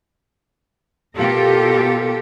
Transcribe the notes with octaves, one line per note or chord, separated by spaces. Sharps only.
B2 F4 G4 A4 A#4